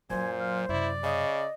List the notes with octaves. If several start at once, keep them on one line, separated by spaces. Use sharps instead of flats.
F#2 A#2 F#3 C5 G#5
F5
F#2 C3 E4 D5
C#3 D#5